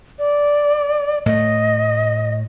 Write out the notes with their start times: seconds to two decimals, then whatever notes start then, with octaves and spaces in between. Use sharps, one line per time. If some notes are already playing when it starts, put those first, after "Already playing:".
0.19 D5
1.26 A2 A3 D#5